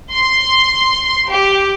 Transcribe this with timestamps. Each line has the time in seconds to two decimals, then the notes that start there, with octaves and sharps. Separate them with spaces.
0.13 C6
1.30 G4